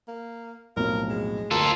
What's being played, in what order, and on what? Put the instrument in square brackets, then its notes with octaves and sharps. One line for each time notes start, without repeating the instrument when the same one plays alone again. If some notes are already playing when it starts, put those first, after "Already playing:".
[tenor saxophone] A#3
[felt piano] B1 F2 A2 [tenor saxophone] A#4
[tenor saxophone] G#3
[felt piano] D2 A#4 A#5 [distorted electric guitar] F4 A4